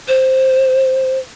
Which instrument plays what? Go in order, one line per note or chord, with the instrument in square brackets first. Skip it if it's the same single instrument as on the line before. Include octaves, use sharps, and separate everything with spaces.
[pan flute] C5